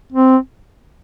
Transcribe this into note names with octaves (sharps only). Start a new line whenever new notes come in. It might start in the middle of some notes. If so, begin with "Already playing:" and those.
C4